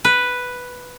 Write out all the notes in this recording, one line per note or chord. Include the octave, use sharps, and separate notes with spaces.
B4